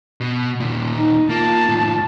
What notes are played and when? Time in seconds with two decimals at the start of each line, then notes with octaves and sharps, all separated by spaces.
0.21 B2
0.60 D#2 A#2
0.97 D#4
1.30 A#3 F4 A5
1.69 A2 D#3